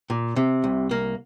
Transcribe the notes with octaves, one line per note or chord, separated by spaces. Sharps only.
A#2
C3
C2
A#3